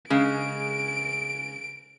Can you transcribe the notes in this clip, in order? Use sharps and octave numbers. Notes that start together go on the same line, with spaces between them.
C#3 G#3 D7